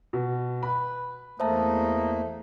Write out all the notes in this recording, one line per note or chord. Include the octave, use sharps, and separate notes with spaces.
B2
B4 B5
E2 A3 A#3 D#4 C5 E5 A5